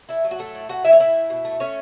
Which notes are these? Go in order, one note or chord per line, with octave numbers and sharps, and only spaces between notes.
A3 E4 E5
F#3
F#4
A2 A3 A4
A2
A3 F#4 F#5
F#3 E4 E5
C#5
A2 E4 E5
A2
B2
A3
A3 C#4 C#5